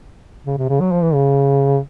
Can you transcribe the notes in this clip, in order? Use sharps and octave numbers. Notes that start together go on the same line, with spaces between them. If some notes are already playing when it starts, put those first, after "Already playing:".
C#3
C3
C#3
F#3
F3
E3
C#3